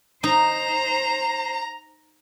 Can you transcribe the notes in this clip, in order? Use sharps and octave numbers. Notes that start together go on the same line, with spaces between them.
D#4 C5 A#5